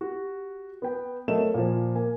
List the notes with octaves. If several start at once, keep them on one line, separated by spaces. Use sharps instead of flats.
F#4 G4
B3 G5
F#3 A3 A#4 D#5 E7
A#2 F3
A#3 G#5